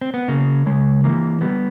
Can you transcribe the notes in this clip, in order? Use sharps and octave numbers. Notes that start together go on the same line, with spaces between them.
C4
B3
C#3 A#3
C#3 G#3
E3 A#3
G3 B3